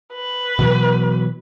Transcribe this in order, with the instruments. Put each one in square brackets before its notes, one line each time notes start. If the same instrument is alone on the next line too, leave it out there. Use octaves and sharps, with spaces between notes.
[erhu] B4
[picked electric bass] B2 E3 F#3